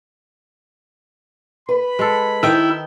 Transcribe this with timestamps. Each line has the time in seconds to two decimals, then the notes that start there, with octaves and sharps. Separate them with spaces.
1.69 B4 B5
1.99 G#3 A4
2.43 D#3 E4 G5